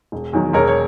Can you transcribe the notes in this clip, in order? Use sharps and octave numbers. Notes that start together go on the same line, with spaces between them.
E1
E2 D#3 F#3
E1 A#4 C#5
C#5